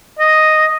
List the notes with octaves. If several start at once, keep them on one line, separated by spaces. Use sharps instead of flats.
D#5